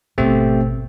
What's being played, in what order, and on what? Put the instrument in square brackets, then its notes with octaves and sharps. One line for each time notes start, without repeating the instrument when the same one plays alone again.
[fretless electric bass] G#1 B2 [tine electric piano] A3 C4 G4